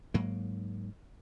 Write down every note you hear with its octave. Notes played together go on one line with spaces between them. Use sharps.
G#2 F#3 A#3